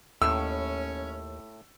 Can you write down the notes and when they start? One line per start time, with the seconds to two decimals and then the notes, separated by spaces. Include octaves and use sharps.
0.22 D#2 A2 C#4 E6